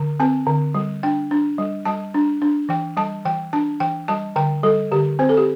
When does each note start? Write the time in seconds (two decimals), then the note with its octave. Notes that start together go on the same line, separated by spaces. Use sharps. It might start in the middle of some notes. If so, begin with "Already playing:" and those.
Already playing: D3
0.20 C4 A5
0.47 D3
0.74 G3
1.03 D4 G5
1.31 D4
1.58 G3
1.85 G3 A5
2.14 D4
2.42 D4
2.69 E3 G5
2.97 G3 A5
3.25 E3 G5
3.53 D4 A5
3.80 E3 G5
4.08 G3 A5
4.36 D3 G5
4.63 G3 A4
4.92 D3 G4
5.19 C4 C5
5.29 A4
5.37 G4